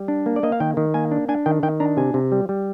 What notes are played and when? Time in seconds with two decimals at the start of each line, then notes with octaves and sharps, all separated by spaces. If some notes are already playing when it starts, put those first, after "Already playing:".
Already playing: G3
0.08 D4
0.26 A#3
0.36 D5
0.43 A#3 D#5
0.52 F5
0.60 D#3 G5
0.77 D#3
0.94 A#3 G#5
1.11 D4
1.29 D4 G#5
1.46 D#3 G5
1.63 D#3 G5
1.80 D4 A#5
1.97 C3 G#5
2.14 C3
2.32 G3
2.49 G3